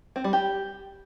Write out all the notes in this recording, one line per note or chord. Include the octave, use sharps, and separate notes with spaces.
C4
G3
G4